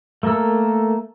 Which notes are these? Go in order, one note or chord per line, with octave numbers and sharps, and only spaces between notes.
A3 A#3 A4 A#4 E6